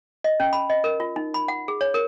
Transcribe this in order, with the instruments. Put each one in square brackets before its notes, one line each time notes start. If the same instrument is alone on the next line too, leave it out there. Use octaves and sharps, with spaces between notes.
[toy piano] D#5
C#4
B5
D#5
A#4
F4
D#4
B5
F#5
G#4
C#5
A#4